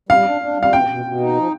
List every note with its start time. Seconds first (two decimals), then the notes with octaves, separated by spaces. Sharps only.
0.09 G3 F5
0.25 D4
0.42 D4
0.57 G3
0.63 F5
0.72 B2 G5
0.89 B2
1.05 B2
1.20 D#4
1.37 F3